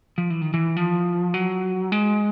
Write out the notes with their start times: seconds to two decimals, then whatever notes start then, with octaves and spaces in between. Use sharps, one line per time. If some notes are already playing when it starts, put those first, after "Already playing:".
0.18 F3
0.30 E3
0.42 D#3
0.54 E3
0.77 F3
1.34 F#3
1.92 G#3